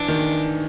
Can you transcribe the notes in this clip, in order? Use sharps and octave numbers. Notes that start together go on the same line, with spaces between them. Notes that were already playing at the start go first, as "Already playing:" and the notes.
Already playing: E3 D4
D#3